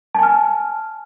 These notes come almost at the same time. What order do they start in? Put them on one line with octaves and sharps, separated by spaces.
A5 G#5 F6